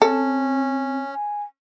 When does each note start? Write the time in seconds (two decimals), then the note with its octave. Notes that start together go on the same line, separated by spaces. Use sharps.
0.02 C4 C#4 A4
1.11 G#5